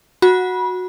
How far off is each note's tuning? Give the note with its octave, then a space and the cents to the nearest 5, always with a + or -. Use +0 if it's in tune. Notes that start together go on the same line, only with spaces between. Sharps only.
F#4 -10 B5 -25